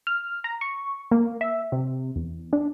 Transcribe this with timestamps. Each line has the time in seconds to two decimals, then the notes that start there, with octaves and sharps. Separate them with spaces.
0.07 F6
0.44 A#5
0.61 C#6
1.11 A#3
1.41 E5
1.72 C3
2.16 E2
2.53 D4